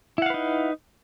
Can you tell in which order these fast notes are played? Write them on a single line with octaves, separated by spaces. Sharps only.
E4 F#5 F5 B4 D#4